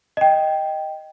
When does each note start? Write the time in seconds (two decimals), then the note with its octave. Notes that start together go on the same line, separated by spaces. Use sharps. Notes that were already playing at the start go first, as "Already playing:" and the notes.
0.17 D#5 G5